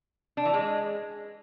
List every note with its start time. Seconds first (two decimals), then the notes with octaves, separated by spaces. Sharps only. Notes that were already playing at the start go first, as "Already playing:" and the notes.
0.37 D4
0.45 E3
0.53 G#3